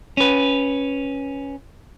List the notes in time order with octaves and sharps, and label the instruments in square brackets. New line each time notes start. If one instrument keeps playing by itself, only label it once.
[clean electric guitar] C#4 B4